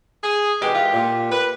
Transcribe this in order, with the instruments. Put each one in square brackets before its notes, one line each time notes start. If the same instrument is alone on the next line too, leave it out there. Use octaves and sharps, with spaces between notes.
[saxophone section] G#4
[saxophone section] B2 D#3 G#3 [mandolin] G4
[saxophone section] E3 G#3 F4
A#2
B4